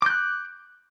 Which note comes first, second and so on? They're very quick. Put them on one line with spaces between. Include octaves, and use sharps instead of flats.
D6 G6 F#6